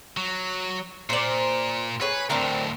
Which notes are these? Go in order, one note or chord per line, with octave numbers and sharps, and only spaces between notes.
F#3
A#2 C5 D5
G#4 B4 C#5
D2 A2 C4 D4 A#4